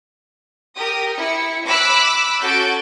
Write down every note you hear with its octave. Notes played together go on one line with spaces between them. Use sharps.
G4 A#4 D#6
E4 C#7
B5 D6 E6 F#6
C#4 F#4 A4 G6 A6 D7